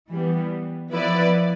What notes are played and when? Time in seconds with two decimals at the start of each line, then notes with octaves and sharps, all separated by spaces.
0.12 E3 G3 B3
0.92 F3 B3 E4 B4 D5